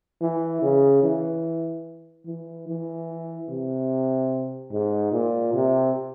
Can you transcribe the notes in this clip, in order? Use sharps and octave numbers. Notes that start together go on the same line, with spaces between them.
E3
C#3
E3
E3
E3
C3
G#2
A#2
C3